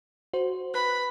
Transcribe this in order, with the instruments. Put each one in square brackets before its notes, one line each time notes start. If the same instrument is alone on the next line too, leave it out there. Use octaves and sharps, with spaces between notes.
[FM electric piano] F#4 C5
[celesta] B4 [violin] B5 [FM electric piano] F#6